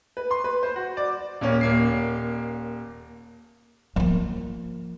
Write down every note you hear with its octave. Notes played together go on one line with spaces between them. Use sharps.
B4
C6
B4
C5
F#4
D5
D#1 A#3 C#4
D#1 A#3 C7
F3 A#3